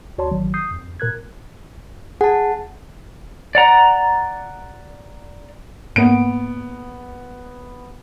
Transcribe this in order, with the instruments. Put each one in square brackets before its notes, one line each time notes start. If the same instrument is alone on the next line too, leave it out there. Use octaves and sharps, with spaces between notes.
[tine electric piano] D2 F#4 C#5 D5 A5 C6
A1 D#3 F#3
D#6 G6 C7
F2
A#2 A#4 F#6 G#6
[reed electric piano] G#4 [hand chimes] F#5 A5
[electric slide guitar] D5 F#5 A#5
[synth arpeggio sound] G#2 A#3 [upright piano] B3 D7